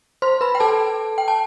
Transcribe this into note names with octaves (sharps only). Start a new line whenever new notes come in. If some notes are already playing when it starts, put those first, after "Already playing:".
C5 C6
B4 B5
G5
A4 A5
G5
A5